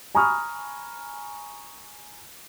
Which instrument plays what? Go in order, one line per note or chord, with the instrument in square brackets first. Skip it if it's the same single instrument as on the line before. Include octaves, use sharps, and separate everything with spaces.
[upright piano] G#5 A#5 B5 C#6 D#6 F6